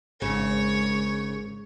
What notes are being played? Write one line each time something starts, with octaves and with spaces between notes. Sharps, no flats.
G#1 G#2 C#3 C#5